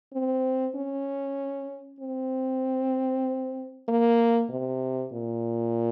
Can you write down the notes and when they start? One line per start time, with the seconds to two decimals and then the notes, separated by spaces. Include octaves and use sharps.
0.13 C4
0.75 C#4
2.00 C4
3.88 A#3
4.50 C3
5.12 A#2